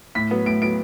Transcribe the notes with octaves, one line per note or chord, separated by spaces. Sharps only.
A2 B6
F#3 B3
A2 D7
F#3 B3 D7